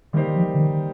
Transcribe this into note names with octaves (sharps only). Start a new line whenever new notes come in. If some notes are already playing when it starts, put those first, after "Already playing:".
D#3 G3 A#3 D#4 G4 C5
F3
D3
D#3